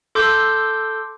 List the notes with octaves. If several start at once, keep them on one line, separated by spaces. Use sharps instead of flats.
A4 C6 D6 E6 G6